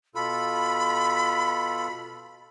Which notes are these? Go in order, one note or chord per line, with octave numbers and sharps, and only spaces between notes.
B2 F4 A4 B5